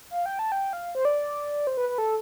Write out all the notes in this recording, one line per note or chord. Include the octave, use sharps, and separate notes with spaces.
F5
G5
A5
G5
F5
C5
D5
C5
B4
B4
A4